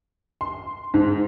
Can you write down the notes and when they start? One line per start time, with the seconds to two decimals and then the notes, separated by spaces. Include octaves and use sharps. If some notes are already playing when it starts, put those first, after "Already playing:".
0.41 C6
0.94 G#2